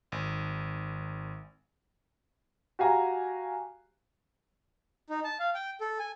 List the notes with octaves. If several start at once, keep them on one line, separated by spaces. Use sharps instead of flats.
G#1
F#4 G4 F5 G#5 A#5
D#4
A5
F5
G5
A4
G#5